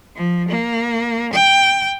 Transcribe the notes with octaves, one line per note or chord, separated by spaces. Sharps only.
F3
A#3
G5